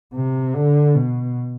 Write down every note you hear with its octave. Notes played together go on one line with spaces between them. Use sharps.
C3
D3
B2